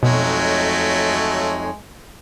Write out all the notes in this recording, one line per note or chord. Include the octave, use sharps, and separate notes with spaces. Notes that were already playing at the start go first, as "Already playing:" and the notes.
F2 B2 F#3 G#3 A3 D#4 C#5